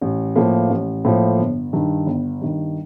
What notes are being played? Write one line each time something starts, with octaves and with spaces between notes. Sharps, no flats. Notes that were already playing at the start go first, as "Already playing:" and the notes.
A1
A2 F3 A#3
A1
A2 F3 A#3
G1
G2 D#3
G1
G2 D#3